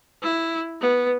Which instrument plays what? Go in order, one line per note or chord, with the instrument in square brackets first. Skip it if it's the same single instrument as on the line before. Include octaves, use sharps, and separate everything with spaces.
[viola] E4
B3